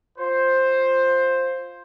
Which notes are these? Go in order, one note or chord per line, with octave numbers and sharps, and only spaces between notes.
F4 C5